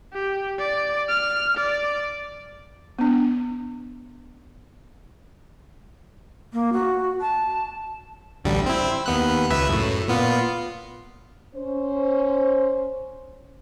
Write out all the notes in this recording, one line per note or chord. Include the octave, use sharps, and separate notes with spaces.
G4
D5
F6
D5
B3 D4
A#3
F#4
A5
A1 D2 G3
C4 E4
D#2 B3 F#6
C#2 B4 E5
F#2 A2
A#2 B3 F4
C#4 C5